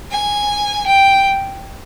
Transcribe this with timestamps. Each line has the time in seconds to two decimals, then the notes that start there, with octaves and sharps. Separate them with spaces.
0.12 G#5
0.86 G5